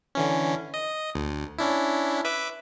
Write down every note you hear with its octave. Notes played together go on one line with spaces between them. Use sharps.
D3 E3 C#4
D#5
D2
C#4 D4 E4
B4 E5 D6